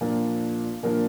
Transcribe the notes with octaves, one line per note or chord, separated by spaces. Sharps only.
A#2 F3 A#3 D4
A#2 F3 A#3 D4 A#4